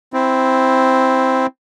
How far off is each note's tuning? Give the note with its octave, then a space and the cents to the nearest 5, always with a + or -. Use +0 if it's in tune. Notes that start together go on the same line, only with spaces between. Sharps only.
C4 +0 E4 +0